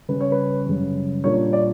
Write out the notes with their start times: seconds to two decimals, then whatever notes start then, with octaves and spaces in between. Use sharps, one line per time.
0.09 C#3 G3 C#4 B4
0.21 C#5
0.32 B4
0.66 F#2 C#3 G3
1.24 A#2 G3 A#3 D4 C#5
1.53 D5